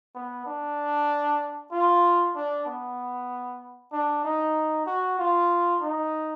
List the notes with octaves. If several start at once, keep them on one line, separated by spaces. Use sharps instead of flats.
B3
D4
F4
D4
B3
D4
D#4
F#4
F4
D#4